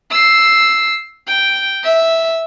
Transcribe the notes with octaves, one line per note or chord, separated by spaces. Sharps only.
E6 C7
G5
E5